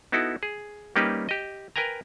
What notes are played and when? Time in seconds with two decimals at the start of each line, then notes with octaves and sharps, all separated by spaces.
0.12 B3 D#4 E4 F#4 A4
0.43 G#4
0.96 G3 A#3 C#4 D#4 G4 B4
1.29 G4 D#5
1.76 A#4 B4 G5 G#5 A#5